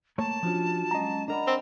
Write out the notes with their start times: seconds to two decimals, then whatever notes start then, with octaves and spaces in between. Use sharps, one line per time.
0.18 A3 A#3 C#5 A5
0.43 F3 C#4 D4 F4 F#4
0.91 F#3 G#3 C#4 D#5 A#5
1.28 D4 A#4 D5 D#5 F#5 A#5 B5
1.47 C4